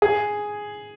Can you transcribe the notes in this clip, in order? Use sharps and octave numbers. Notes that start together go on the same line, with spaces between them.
G#4